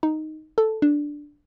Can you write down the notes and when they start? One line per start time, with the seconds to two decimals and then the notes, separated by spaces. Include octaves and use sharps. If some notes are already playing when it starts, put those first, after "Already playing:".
0.03 D#4
0.58 A4
0.82 D4